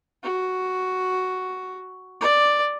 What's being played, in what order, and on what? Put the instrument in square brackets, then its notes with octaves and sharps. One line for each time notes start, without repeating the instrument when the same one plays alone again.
[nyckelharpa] F#4
D5